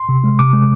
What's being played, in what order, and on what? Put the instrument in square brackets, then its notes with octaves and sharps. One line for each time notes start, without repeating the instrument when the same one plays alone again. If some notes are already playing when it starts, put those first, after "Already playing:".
Already playing: [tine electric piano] C6
C3
G#3
C3 D6
G#3